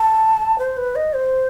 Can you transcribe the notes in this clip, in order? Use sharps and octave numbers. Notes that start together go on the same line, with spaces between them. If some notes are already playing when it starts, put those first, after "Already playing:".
Already playing: A5
C5
B4
D#5
C5